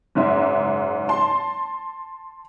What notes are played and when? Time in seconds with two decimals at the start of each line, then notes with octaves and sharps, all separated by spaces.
0.15 F#1 G#2 E5
1.09 A5 C6